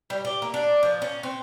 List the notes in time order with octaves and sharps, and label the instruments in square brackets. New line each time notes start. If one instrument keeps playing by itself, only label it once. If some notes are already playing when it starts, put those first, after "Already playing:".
[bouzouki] G3
G4
A#3
D4
F3
C#4
C4